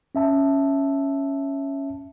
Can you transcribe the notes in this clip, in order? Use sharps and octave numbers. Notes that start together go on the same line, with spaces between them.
C#4 E5 A5